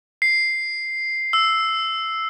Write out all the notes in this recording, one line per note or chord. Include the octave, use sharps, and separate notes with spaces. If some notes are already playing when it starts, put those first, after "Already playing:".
C7
E6